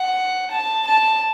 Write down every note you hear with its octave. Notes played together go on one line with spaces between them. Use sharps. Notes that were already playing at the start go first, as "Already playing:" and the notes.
Already playing: F#5
A5
A5